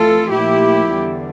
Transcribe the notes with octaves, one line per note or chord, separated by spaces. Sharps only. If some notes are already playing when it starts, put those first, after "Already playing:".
Already playing: F2 E3 A3 F4 A4
A#2 F3 A3 E4 G4
E2 D3 G3